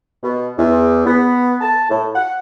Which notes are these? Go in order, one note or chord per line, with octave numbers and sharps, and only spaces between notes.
B2
E2
B3
A5
A2
F#5